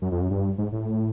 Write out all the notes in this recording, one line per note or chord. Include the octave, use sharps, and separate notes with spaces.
F#2
F2
F#2
G2
G#2
A2